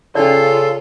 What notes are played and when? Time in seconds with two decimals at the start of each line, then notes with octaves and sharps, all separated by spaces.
0.15 C#3 C#4 F4 A4 D5